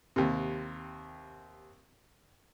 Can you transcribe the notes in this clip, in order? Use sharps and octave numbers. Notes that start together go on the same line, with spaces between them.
D#2 C3